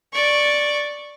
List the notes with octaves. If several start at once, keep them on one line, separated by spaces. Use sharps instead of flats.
D5 C#6